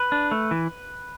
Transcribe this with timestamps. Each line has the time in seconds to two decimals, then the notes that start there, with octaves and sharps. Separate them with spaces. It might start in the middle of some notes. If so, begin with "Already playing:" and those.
Already playing: B4
0.12 D4
0.31 A3
0.51 E3